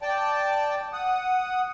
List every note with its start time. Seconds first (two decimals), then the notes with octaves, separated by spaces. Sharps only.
0.02 D5 G5 A5
0.93 F#5 D#6